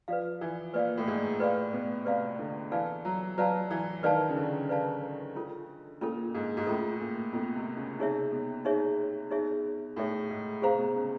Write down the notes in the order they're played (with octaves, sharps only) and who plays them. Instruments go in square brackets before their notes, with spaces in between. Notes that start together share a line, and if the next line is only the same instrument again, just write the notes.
[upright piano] F3 [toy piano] B4 D5 F5
[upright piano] E3
[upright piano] A#2 [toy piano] B4 D5 F5
[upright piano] A2
G#2
[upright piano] A2 [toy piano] B4 D5 F5
[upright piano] B2
[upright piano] C3 [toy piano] B4 D5 F5
[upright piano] D3
[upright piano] E3 [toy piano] B4 D5 F5 A5
[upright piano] F#3
[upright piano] F#3 [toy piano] B4 D5 F5 A5
[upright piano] E3
[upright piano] D#3 [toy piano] B4 D5 F5 A5
[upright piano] C#3
D3
[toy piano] B4 D5 F5 A5
C#4 F4 A4
[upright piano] A#2 [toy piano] C#4 F4 A4
[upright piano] G#2
G#2
[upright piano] A2 [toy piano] C#4 F4 A4
[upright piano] A#2
[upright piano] B2 [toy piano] C#4 F4 A4
[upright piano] C3
C#3
[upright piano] C3 [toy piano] D#4 G#4 C#5 E5
[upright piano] B2
[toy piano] D#4 G#4 C#5 E5
D#4 G#4 C#5 E5
[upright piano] A2 [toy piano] D#4 G#4 C#5 E5
[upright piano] G#2
[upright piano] C3 [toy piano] G#4 C5 F5 A#5
[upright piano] B2
C#3